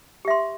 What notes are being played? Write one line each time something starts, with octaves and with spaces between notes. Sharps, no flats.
G4 E5 C6